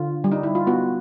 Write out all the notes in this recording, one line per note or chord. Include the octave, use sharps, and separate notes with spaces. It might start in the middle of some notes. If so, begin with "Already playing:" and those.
Already playing: D3 F4
G3
D#4
E4
F4
B3 F#4